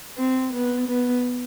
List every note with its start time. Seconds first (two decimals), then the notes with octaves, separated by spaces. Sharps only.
0.17 C4
0.53 B3
0.89 B3